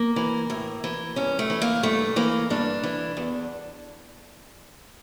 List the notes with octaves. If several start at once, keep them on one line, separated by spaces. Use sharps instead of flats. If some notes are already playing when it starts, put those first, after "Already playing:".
Already playing: A#3
E3
A2
E3
G2 C#4
A3
E3
A#3
G2 A3
E3 A#3
G2 D4
E3
E2